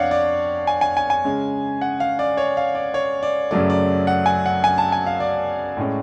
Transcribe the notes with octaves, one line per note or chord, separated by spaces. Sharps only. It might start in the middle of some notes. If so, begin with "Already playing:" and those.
Already playing: F2 D4 C#5 D5 F5 F#5
D5
G#5
G#5
G#5
G#5
C#3 G#3 C#4
F#5
F5
D5
C#5
F5
D5
C#5
D5
F#2 C#3 F#3 A3 D5
D5
F#5
G#5
F#5
G#5
A5
G#5
F5
D5
A2 G#3 C#4